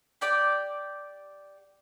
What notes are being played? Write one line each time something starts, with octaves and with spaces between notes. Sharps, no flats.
G4 D5 G5